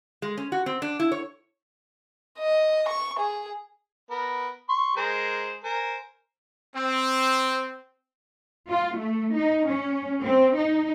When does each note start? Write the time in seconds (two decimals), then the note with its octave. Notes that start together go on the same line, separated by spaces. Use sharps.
0.22 G#3
0.37 C#4
0.52 F#4
0.66 C4
0.82 D4
1.00 E4
1.12 C#5
2.38 D#5
2.88 C#6
3.19 G#4
4.10 B3 A#4
4.69 C6 C#6
4.97 G#3 A#4 C5
5.64 A#4 C5 G#5
6.75 C4
8.69 F4
8.97 A3
9.36 D#4
9.69 C#4
10.24 C4
10.58 D#4